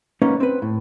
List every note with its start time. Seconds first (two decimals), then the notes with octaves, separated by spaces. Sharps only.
0.22 A#3 B3 C#4 D#4
0.40 C4 B4
0.62 A2